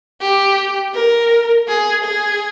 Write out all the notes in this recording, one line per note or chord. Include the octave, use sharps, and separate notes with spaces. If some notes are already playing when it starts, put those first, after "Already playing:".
G4
A#4
G#4
G#4